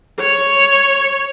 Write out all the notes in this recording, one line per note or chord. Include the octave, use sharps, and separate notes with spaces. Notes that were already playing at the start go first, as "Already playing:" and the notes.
C#5